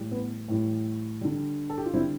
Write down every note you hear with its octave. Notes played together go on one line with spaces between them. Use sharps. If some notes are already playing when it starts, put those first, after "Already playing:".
Already playing: A2 E3 G3
B3
A2 E3 G3
D3 G3
A4
G4
F4
D3 G3 C4 E4